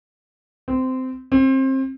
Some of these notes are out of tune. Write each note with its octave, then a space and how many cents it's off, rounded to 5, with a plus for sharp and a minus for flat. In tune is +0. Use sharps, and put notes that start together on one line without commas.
C4 -20
C4 +25